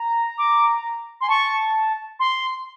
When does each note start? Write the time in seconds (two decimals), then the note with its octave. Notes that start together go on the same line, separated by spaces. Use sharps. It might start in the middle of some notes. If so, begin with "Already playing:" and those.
Already playing: A#5
0.38 D6
1.21 G#5 C6
1.29 A5 C#6
2.19 C6